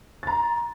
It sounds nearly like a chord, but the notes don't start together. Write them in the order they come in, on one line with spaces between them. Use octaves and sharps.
A6 A#5 C6